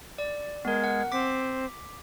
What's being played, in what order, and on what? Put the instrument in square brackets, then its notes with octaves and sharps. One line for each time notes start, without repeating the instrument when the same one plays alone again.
[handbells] D5
[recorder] G#3 [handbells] B3 A#4
[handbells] F#5
[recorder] C4 [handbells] D6 B6